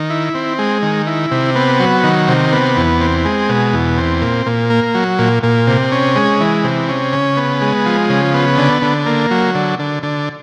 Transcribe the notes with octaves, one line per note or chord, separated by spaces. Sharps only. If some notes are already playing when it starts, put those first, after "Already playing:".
Already playing: D#3
E4
C4
G#3
D#3
E4
C3
B3
F#3
D#3
C3
B3
E2
C4
G#3
B2
E2
C4
A#2
A#2
A#3
F#3
A#2
A#2
C3
C#4
G#3
E3
C3
C#4
C#3
B3
G#3
F3
C#3
B3
D3
D3
A#3
F#3
D3
D3
D3